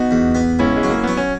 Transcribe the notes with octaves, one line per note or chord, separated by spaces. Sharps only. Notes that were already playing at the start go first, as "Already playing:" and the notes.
Already playing: B3 D#4 F#4
E2
B3
C#2 C#4 E4
G#3
F#3
A#3
F#3 B3
C#4